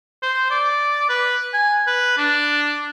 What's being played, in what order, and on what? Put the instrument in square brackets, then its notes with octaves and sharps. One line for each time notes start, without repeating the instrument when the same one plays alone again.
[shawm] C5
D5
B4
G#5
B4
D4